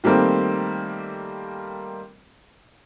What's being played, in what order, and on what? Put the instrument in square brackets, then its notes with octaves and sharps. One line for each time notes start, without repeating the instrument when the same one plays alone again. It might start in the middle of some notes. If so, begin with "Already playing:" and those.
[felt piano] D#3 G3 A3 A#3 C4